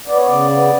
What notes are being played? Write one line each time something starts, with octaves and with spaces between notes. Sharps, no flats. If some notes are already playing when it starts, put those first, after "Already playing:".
B3 D5
C#5
C#3 D5
B3